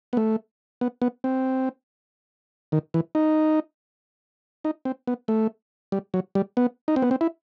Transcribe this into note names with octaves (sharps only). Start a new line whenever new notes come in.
B3
A3
B3
B3
C4
D#3
E3
D#4
D#4
C4
B3
A3
G3
F#3
G3
B3
D#4
C4
B3
C4
E4